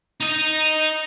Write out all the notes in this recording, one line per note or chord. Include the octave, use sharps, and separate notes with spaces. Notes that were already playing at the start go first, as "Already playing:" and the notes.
D#4 D#5